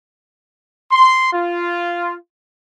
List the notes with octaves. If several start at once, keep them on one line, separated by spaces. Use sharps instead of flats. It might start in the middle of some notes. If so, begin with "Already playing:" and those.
C6
F4